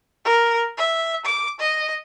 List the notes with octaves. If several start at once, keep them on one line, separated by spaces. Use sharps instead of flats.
A#4
E5
D6
D#5